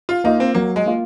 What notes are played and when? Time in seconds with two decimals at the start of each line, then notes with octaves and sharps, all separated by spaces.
0.09 F4
0.24 A#3 D#4 F4
0.40 C4
0.54 F#3 A#3
0.76 G#3
0.86 A#3 F4